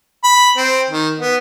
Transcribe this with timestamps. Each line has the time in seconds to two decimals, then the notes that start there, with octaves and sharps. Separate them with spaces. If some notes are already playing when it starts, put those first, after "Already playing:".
0.24 B5
0.57 C4
0.90 D#3
1.20 B3